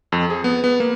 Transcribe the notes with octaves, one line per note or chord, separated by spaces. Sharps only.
F2
G#4
B3
B3
A#3